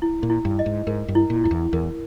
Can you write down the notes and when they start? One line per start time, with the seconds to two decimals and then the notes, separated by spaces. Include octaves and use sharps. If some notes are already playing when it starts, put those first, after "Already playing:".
0.02 E4
0.23 A#2
0.30 E4
0.45 G2
0.59 D#5
0.66 G#2
0.87 G#2 A#4
1.08 G2
1.15 E4
1.30 A#2
1.44 G2 E4
1.51 E2
1.73 E2 A#4